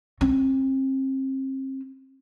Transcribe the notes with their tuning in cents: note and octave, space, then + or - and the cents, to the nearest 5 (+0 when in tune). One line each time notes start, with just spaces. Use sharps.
C4 +35